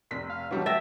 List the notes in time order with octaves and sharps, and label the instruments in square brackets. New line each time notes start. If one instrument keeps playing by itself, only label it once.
[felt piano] F1 B6
[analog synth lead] F5
[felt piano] E3 G3 A3 [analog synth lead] F#3
[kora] E5 [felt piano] G5 A6 A#6